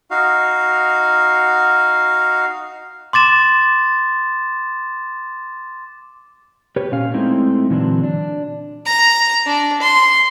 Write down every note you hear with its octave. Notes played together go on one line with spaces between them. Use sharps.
D#4 F#4 F5
C6 D6 A6 E7
G4 B4 C#5
A#2 C#4 F5
G#3 A3 C4 D#4 E4
A#2 D3 E3 F#3 C4 D4
D4
A#5
D4
C6